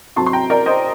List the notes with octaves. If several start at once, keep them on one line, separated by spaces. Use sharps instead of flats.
C3 F#3 C4 A5 C6
C6
G5 A#5
A#4 D5
C5 D#5